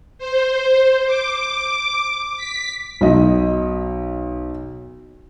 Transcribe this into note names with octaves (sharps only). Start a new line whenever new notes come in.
C5
D6
B6
B1 D#5